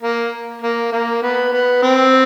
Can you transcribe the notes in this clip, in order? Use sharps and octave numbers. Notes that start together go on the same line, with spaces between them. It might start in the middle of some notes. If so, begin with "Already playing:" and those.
A#3
A#3
A#3
B3
B3
C4